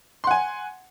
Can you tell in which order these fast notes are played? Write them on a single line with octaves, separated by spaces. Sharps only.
C6 F#5 G#5